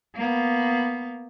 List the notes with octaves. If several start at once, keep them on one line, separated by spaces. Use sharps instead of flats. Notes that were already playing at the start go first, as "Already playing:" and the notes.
A#3 B3